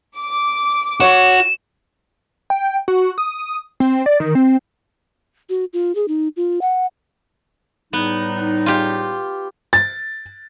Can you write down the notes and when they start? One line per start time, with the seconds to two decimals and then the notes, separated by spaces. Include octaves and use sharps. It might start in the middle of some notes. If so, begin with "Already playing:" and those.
0.18 D6
1.00 F#4 C#5 C#6 E7
2.50 G5
2.88 F#4
3.18 D#6
3.80 C4
4.06 D5
4.20 D#3
4.35 C4
5.50 F#4
5.73 F4
5.95 G#4
6.08 D#4
6.37 F4
6.62 F#5
7.93 A2 G3 B3 D#4
8.66 F4 G4
9.73 A6